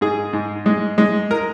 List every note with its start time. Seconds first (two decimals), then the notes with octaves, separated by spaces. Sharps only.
0.01 G#2 G#4
0.33 G#2
0.66 G#3
0.98 G#3
1.31 A#4